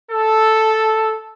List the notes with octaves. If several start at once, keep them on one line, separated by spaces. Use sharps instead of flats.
A4